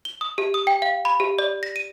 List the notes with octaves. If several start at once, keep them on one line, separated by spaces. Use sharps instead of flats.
G7
D#6
G4
D#6
G5
F5
B5
G4
D5
A#6
D#7